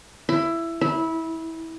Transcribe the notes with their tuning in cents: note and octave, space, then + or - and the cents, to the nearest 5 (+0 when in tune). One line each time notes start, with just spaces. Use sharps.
E4 +15
E4 -20